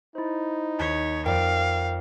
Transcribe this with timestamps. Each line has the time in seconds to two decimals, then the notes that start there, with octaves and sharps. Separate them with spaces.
0.15 D#4 E4 C5
0.79 D#2 C#5 B6
1.26 F2 A#4 D5 F5 G5